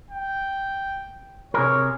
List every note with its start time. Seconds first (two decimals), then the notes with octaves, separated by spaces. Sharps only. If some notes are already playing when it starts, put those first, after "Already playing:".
0.10 G5
1.54 C3 G#4 A#4 C#5